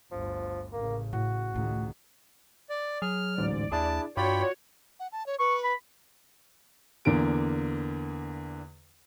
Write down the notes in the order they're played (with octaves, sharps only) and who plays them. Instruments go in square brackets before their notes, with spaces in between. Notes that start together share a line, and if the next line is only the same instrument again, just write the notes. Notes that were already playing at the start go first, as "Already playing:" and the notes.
[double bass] G1 D2 [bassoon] F3
[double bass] A1 C#3 [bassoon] A#3
[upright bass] A2 [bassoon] F#4
[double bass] C#2 D#3 [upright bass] A2 A3
[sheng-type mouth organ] D5
[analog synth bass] F#3 [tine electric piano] G#4 [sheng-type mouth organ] F6
[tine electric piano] A1 D2 G#2 [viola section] D5
[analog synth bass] D#2 [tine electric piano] D4 E4 G#4 [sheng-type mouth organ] A5
[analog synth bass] G2 [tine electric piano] F4 D5 [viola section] F#4 C#5 [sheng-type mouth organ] G5 B5
[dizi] F#5
A5
C#5
[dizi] B4 [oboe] C#6
[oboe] B5
[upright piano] E2 D3 A#3 D7